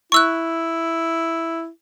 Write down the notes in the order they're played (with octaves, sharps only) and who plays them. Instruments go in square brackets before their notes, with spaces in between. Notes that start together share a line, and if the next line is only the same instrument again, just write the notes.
[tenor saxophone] E4 [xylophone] C#6 E6 F#6